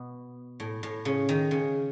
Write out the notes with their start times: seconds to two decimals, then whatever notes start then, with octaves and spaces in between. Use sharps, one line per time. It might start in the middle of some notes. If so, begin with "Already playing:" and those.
Already playing: B2
0.60 A2
0.83 A2
1.05 C#3
1.29 D#3
1.51 C#3